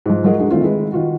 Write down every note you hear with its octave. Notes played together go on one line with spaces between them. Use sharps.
G#2 F3
F3 F#3 G#3 F#4 A#4 D#5
G#3 D4 D#4 F#4
D#3 A3 C4 F4
D#3 G#3 B4
D#3 F4 F#4